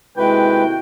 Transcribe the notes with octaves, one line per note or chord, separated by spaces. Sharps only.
D#2 C3 G#3 A3 E4 F#4 B4 G5